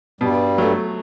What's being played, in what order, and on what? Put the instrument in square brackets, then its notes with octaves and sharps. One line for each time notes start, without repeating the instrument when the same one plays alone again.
[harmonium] G2 G3 [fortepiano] B2
[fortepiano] F#3 A3